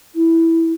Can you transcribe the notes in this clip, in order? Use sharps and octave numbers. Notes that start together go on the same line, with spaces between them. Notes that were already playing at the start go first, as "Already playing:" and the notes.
E4